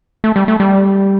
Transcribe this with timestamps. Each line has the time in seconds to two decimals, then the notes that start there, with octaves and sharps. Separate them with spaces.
0.24 A3
0.36 G3
0.48 A3
0.60 G3